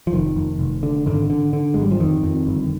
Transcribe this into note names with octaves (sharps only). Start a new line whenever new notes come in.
F3
F1 D#3
F1
F1
D3
G#1 D3
D3
D3
G#1 G#3
G3
F3
F2 D#3
F2
G1